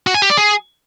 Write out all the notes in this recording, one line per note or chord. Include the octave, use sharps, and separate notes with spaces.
F#4
G#5
G4
D5
G#4